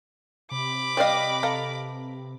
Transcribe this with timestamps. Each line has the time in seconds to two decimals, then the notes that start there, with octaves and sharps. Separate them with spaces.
0.51 C3 B5 D6
0.97 G3 B4 D5 D#5 F5
1.43 A4 F5 A#5